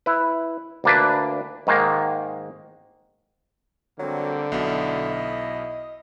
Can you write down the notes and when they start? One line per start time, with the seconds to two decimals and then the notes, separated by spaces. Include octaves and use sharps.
0.06 E4 B4
0.84 D2 A#3 D4 B4
1.67 G#2 D#3 G#3 A#3
3.99 D3 F#3 G3 A#3 C4
4.52 B1 B2 E4 D#5